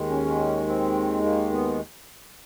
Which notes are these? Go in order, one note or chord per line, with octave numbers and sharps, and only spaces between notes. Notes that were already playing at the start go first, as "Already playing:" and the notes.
Already playing: D#2 D#3 G#3
C#4
C4
A#3
B3